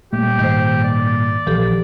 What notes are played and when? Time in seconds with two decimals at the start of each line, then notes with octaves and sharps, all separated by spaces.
0.13 A#2 G3 A3 G4
0.39 G#2 D#3 C5
0.84 D5
1.47 A#1 E3 F3 G4 A4